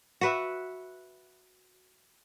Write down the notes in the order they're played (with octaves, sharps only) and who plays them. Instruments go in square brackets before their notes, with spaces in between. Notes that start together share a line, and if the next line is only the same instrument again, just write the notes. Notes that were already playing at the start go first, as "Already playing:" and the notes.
[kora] F#4 B4 E5